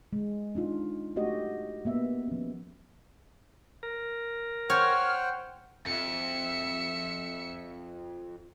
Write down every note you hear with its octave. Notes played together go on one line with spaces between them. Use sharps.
G#3
D4 D#4 F4
A3 F#4 G4 D#5
A#3 B3 E5
F3 C#4
A#4
C5 C#5 F#5 G5 F6
F2 E5 C#7